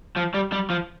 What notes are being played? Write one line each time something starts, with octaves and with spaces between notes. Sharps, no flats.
F3
G3
G3
F3